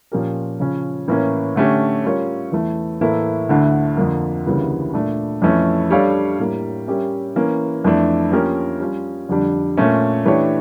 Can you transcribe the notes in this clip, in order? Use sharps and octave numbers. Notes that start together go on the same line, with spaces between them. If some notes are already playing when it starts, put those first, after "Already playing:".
A#2 F3 C#4 G4 A#4
C#3 F3 C#4
A2 E3 A#3 C#4
D3 A3 C#4 G4
G3 C#4 F4 A#4 C#5
E2 E3 A3
A2 E3 A#3 E4 A4
D2 D3 A3 E4
F2 D3 F3 A#3
D2 C#3 E3 G3 A#3
A#2 A3 D4
F2 E3 A3 C#4
G3 D4 A4 C#5 F5
A2 G3 A#3
G3 C#4 G4 A#4 E5
E3 A#3 C#4
F2 E3 A3 D4
F3 A#3 C#4 G4 A#4
G3 C#4 F4
F2 D3 G3 D4
A#2 A3 C#4
E3 A3 D4 G4 C#5